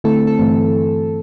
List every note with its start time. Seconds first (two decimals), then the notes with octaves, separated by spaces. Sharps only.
0.04 D3 A3 C4 E4 A4
0.27 A4
0.39 G2 E3 A3 C4